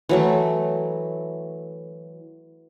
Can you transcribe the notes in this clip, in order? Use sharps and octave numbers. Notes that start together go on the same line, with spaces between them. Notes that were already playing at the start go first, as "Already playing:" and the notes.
E3 F#3 A3